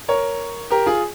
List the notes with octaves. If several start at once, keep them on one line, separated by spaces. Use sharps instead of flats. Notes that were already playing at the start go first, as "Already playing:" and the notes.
A#4 C#5
G4 A#4
F4 G#4